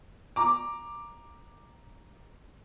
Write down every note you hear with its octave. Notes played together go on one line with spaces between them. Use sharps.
A#5 D6